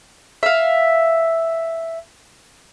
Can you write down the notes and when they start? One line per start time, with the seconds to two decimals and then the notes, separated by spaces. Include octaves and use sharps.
0.43 E5 F5